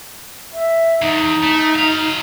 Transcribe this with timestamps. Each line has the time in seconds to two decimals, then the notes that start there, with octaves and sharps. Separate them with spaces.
0.53 E5
1.02 E2 D#4
1.43 A3
1.75 F#3 F5